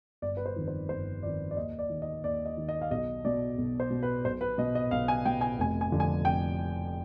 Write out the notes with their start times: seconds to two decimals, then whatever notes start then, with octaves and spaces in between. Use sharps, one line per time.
0.22 G1 D5
0.37 B4
0.46 C5
0.56 F2 D#3
0.68 C5
0.89 G1 C5
1.23 F2 D#3 D5
1.51 D5
1.57 D#2 D#5
1.79 D5
1.90 D#3
2.02 D#5
2.24 D#2 D5
2.45 D#5
2.57 D#3
2.69 D#5
2.81 F5
2.91 B1 D#5
3.25 B2 D5
3.58 B1
3.80 C5
3.90 B2
4.03 B4
4.25 B1 C5
4.41 B4
4.58 B2 D#5
4.75 D#5
4.91 B1 F5
5.08 G#5
5.25 B2 G5
5.41 G#5
5.58 F1 G#5
5.81 G#5
5.92 F2 D3 F3
6.00 G#5
6.25 F1 G5